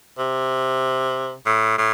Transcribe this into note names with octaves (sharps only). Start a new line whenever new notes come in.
C3
A2
A2